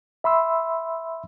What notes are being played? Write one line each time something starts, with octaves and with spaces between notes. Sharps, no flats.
E5 B5 C6 E6